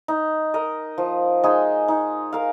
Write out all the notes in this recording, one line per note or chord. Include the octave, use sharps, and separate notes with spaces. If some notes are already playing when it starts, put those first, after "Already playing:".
D#4
A#4 D#5
F3
G#3 D#4 G#4
D#4
A#4 F5